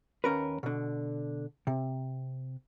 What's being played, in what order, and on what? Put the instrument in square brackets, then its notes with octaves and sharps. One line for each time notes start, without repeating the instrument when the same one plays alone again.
[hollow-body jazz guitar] D#2 C#4 A#4 B4
B2 D3
C3